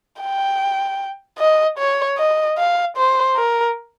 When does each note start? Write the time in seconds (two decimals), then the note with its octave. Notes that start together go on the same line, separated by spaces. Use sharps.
0.20 G5
1.39 D#5
1.78 C#5
2.18 D#5
2.57 F5
2.97 C5
3.36 A#4